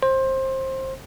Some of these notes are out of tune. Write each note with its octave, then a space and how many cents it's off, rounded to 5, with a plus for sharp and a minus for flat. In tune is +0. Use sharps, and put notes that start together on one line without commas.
C5 +20